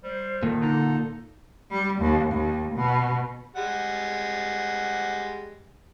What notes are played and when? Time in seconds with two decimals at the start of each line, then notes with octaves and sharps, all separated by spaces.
0.03 G3 C5
0.43 A#2 D#3 A4
0.62 D3 D#4
1.71 G3
2.01 D#2
2.32 D#2
2.76 B2
3.56 G3 G#3 F#5